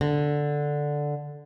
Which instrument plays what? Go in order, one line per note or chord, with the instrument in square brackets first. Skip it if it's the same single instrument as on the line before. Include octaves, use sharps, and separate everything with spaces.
[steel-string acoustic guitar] D3